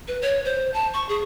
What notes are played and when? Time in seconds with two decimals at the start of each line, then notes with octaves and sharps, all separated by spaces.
0.08 B4
0.22 C#5
0.45 C5
0.74 A5
0.94 C#6
1.09 G#4